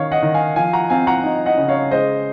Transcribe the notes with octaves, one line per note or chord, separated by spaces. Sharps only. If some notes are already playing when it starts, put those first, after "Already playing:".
Already playing: D#3 C#4 C#5 F5
D#5 F#5
D#3
F5 G#5
F3 F5 G#5
F#5 A#5
C4 F5 G#5
F#5 A#5
D#4
D#5 F#5
C#3
C#5 F5
G#3 C5 D#5